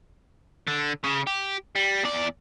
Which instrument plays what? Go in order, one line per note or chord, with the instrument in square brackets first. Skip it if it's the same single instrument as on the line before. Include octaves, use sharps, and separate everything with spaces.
[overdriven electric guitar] D3
C#3
G4
G3
E2 D5